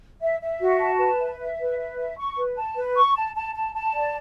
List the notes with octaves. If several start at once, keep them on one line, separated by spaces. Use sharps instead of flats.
E5
E5
F#4
A5
B4
E5
E5
B4
E5
E5
C#6
B4
A5
B4
C#6
A5
A5
A5
A5
D5